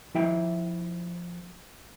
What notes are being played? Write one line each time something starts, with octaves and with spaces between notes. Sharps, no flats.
F3 E4 E5 G5